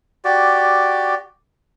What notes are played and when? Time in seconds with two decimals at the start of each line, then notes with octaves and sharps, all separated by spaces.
0.24 F#4 G4 D5